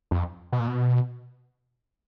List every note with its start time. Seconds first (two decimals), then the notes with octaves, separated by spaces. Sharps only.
0.11 F2
0.52 B2
0.60 A#2
0.67 B2